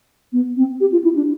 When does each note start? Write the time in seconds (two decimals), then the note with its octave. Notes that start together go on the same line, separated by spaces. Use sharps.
0.33 B3
0.57 C4
0.80 G4
0.92 F4
1.04 E4
1.16 D4